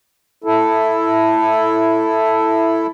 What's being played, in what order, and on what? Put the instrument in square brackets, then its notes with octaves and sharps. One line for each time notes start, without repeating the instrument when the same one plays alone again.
[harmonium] E4 A4